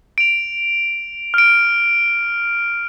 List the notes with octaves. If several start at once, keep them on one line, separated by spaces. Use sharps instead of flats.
D7 F7
F6 D7